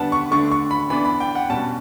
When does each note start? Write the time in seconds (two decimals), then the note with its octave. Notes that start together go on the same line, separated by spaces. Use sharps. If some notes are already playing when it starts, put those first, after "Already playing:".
Already playing: D3 G3 B3 D4 F#5 A5
0.12 C#6
0.31 D3 A3 D4 C#6
0.51 C#6
0.71 B5
0.90 E3 B3 D4 B5
1.05 B5
1.20 G5
1.35 F#5
1.49 B2 G3 C#4 A5